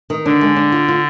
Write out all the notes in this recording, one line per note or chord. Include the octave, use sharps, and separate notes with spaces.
D#3
D3 D4
G#3
D4
F4
F4